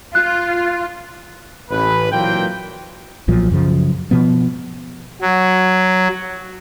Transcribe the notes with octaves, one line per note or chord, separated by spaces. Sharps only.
F4 F#6
A1 B4
A#2 E3 F#3 A#3 C4 G5
B1 A#2 F3 F#3
F#2 C#3 F3
B2 F3 B3
F#3